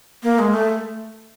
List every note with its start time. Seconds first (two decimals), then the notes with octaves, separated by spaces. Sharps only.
0.23 A#3
0.39 G#3
0.54 A3